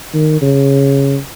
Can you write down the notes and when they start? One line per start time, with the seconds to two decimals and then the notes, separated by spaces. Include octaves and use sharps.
0.14 D#3
0.41 C#3